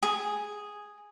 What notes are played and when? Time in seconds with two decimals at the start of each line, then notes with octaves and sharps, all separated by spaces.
0.03 G#4